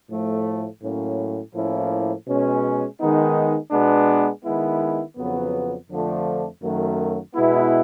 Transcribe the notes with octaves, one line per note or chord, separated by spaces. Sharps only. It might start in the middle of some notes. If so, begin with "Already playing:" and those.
A2 F3 A3
A2 F#3 A#3 C#4
A2 F3 A#3 C#4 E4
B2 G#3 C#4
D#3 G#3 B3 D#4
B2 G#3 B3 D4
D#3 G#3 B3 E4
F2 C#3 F#3 B3
F2 D3 F3 A3 D4
F#2 D#3 F#3 A3
B2 G#3 B3 E4